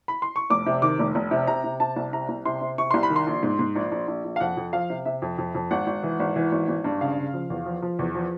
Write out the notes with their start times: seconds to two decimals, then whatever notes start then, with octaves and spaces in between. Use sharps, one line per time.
0.08 B5
0.22 C6
0.36 C#6
0.50 F1 D6
0.66 C3
0.82 D#3 D6
0.99 F1
1.15 F1
1.31 C3
1.47 C3 A#5
1.64 C3
1.80 C3 A5
1.96 C2
2.13 C3 A#5
2.29 C2
2.45 C3 C6
2.61 C3
2.78 C3 C#6
2.91 C2 C6
3.03 B5
3.10 D#3
3.16 C6
3.27 A#1
3.43 G#2
3.59 G#2
3.76 A#1
3.92 A#1
4.08 A#1
4.24 A#1
4.36 F5
4.40 F2 F#5
4.57 F2
4.73 F3 F5
4.90 C3
5.05 C3 E5
5.22 F2
5.38 F2
5.55 F2
5.71 G#1 F#5
5.87 G#1
6.03 E3
6.20 G#1
6.36 E3
6.52 G#1
6.68 G#1
6.84 G2
7.01 C#3 F5
7.17 C#3
7.34 F3
7.50 E2
7.66 F3
7.82 F3
7.99 E2
8.15 F3